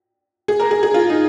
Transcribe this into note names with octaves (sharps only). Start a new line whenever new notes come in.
G#4
A#4
G#4
G#4
F4
D#4